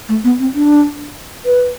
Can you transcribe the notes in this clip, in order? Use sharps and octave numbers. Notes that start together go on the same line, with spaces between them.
A3
B3
C4
D4
B4